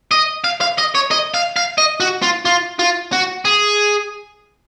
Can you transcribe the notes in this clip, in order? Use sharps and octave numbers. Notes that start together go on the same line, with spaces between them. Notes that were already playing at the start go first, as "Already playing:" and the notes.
D#5
F5
F5
D#5
C#5
D#5
F5
F5
D#5
F#4
F4
F4
F4
F#4
G#4